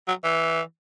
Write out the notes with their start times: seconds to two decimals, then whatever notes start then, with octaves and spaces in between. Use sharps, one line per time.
0.08 F#3
0.24 E3